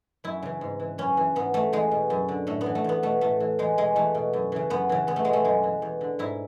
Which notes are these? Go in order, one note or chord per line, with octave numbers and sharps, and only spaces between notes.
F#2 E4
C#3 E3
G#2
E3
F#2 C#4
E3
G#2 B3
E3 A3
E2 G#3
B2
F#2
D3
A2 A3
B3
E3
A3
E2 B3
B2 A3
A2 A3
E3
E2 G#3
B2 G#3
E2 A3
B2
F#2
C#3 E3
F#2 B3
C#3 E3
E2 B3
A3
B2 G#3
A3
F#2 G#3
E3
E2
D3
G#2 E4